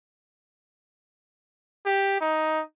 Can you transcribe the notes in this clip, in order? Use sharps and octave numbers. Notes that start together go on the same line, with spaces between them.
G4
D#4